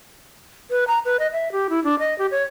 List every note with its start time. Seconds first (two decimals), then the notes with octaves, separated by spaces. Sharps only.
0.70 B4
0.88 A#5
1.05 B4
1.19 D#5
1.32 E5
1.52 G4
1.70 E4
1.84 D4
1.99 D#5
2.18 G4
2.31 C#5